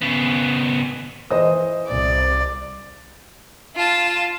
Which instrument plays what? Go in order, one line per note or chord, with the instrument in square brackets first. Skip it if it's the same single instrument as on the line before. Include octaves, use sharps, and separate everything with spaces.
[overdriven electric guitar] C#3 B3
[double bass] E3 [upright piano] C5 D#5 D#6
[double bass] C2 [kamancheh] D5
[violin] F4 A5